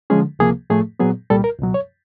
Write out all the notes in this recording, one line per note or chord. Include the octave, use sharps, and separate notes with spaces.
D3 F3 G#3 C#4 G#4
C#2 C3 F3 A#3 G#4
A2 F3 A3 G#4
A#2 F#3 B3 G#4
C2 A#2 G3 A4
A#4
C#2 B2 F#3
C#5